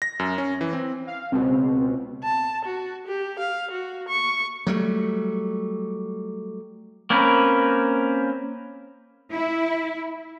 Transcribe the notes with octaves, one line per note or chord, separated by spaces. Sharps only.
A#6
F#2
C#4
E3
C4
F5
C#2 B2 C4
A5
F#4
G4
F5
F#4
C#6
F#3 G3 A3
A#3 C4 C#4 A#4 B4
E4